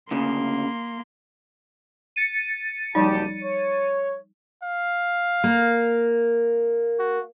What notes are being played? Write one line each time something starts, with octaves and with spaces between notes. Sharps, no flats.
D2 C#3 A#3 C6
A6 C#7 D#7
F#1 F3 G3 D#4 G4 A5
C#5
F5
A#3
F#4